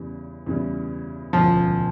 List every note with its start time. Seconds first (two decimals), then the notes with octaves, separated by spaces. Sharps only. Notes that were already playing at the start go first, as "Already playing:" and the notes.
Already playing: E2 C#3 E3 G3
0.46 E2 C#3 E3 G3
1.33 E1 D2 C#3 F3